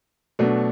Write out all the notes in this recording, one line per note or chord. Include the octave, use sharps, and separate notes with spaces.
B2 F#3 A3 D4